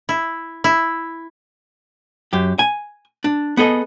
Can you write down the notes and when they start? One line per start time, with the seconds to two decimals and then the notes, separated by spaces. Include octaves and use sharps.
0.09 E4
0.64 E4
2.33 F#2 G4
2.59 G#5
3.24 D4
3.57 B3 G#4 A4 D#5